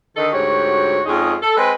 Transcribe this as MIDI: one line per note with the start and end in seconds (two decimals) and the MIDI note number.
0.17 0.31 50
0.17 0.31 51
0.17 0.31 69
0.17 0.31 75
0.32 0.99 38
0.32 0.99 44
0.32 0.99 66
0.32 0.99 67
0.32 0.99 73
1.06 1.35 41
1.06 1.35 56
1.06 1.35 61
1.06 1.35 63
1.06 1.35 68
1.41 1.56 69
1.57 1.71 56
1.57 1.71 60
1.57 1.71 71